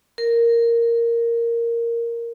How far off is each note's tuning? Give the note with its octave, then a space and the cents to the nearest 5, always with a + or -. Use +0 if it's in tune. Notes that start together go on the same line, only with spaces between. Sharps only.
A#4 -5